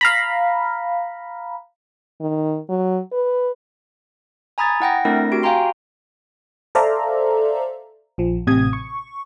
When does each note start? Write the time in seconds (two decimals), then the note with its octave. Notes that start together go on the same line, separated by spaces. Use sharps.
0.01 F5 A#5 B5
2.21 D#3
2.69 F#3
3.12 B4
4.58 G#5 A#5 B5 D#6 G#6 A6
4.80 E4 F#5 G5 A#6
5.05 A3 C4 D4 E4 A#4 A#6
5.32 F#4 G4 D7
5.43 F5 G5 G#5 A#5 C6
6.75 A4 C5 D5 E5 F5 A#5
8.18 A#1 F3
8.47 A1 C3 D#6 G#6
8.73 C#6